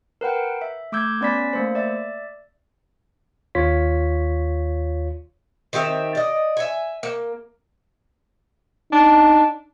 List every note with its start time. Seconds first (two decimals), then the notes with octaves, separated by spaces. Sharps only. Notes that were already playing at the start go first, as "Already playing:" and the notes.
0.21 A#4 B4 F#5 G5
0.62 E5
0.92 A3 D6 E6 G6 G#6
1.21 B3 C#4 D5 B5 B6
1.53 A3 A#3 C5
1.75 D5 E5
3.55 D#2 F4 C#5 B6
5.73 D#3 C4 G4 E5
6.15 D5 D#5
6.57 E5 G#5
7.03 A#3
8.92 D4 D#4